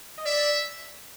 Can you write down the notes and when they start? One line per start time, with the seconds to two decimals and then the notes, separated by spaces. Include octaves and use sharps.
0.18 D#5
0.26 D5 E5